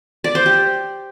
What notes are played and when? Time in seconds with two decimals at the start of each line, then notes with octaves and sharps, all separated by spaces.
0.24 D5
0.35 C5
0.46 G4